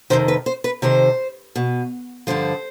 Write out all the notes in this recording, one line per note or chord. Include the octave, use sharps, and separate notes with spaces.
F2 C3 D#3 C5
B4
C5
B4
F2 C3 D#3 C5
B2
G2 D3 F3 C5